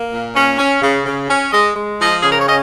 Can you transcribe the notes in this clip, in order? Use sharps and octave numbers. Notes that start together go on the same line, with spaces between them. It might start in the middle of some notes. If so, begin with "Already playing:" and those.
Already playing: A#3
A#2
C#4
C#4
C#3
C#3
C#4
G#3 D#5
G#3
F3 D#5
C#3 G#4
A#4
C#5
C#4 D#5